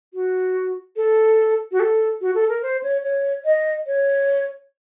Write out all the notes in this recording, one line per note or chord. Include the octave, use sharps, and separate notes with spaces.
F#4
A4
F#4
A4
F#4
A4
A#4
C5
C#5
C#5
D#5
C#5